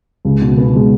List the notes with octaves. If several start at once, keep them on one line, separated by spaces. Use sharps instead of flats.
C#2
B2
B3
G#3